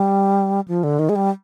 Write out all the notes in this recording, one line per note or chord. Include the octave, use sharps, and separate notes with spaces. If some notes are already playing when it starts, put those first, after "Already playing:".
Already playing: G3
F3
D3
D#3
G#3
G3